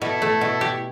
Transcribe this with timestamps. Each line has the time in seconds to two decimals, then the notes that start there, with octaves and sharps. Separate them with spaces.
0.02 B2 E4 A4
0.22 A3
0.41 B2
0.61 G4